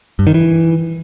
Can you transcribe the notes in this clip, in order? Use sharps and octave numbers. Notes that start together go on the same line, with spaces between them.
G2
D#3
E3